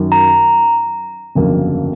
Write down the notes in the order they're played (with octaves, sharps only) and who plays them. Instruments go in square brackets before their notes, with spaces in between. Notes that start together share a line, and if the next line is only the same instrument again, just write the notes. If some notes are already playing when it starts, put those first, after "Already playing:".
Already playing: [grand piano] F#2 D#3 F#3
[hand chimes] A#5
[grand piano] G1 F2 C#3 F#3 A#3